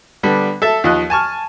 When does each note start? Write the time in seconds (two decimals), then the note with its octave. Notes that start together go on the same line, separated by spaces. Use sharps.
0.23 D3 G3 B3 D4
0.62 A4 E5 A5
0.84 D#2 F3 D#5 F#6
1.10 G#5 A5 C#6 F6